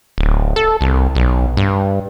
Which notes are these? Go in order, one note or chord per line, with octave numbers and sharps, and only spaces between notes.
D1
A4
C2
B1
G2